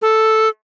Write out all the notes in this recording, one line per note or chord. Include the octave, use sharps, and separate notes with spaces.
A4